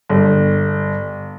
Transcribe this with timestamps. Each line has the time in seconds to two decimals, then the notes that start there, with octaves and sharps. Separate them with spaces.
0.09 G1